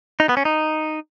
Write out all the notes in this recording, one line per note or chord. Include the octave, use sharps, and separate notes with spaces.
D#4
B3
C#4
D#4